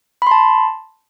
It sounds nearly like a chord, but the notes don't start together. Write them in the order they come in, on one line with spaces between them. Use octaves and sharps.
B5 C6 A5